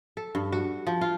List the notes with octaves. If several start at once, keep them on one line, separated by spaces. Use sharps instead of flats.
A4
G2
F#4
F3
F4